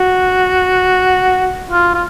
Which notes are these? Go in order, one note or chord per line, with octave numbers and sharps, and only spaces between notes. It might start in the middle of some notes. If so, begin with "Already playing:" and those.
Already playing: F#4
F4
F4